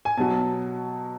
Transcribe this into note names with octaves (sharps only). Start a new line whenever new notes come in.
G#5
B2 F#3 A5